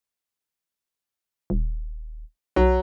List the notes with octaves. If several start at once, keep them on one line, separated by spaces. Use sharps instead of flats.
D#1
B1 F#3